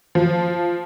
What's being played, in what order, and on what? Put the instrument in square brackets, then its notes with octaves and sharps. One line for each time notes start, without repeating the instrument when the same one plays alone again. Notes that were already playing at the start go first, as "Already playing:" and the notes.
[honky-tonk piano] F3